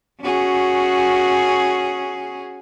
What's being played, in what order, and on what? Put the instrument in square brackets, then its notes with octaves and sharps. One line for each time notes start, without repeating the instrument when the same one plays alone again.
[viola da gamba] C#4 F#4 G#4